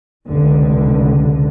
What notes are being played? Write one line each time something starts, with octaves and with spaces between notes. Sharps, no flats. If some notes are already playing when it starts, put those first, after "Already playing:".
F1 C#2 D3